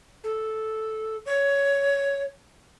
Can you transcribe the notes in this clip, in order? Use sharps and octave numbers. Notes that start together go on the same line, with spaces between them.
A4
C#5